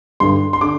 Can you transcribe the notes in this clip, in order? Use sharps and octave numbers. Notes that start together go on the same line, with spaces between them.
G2 D3 C6
C6
D3 D6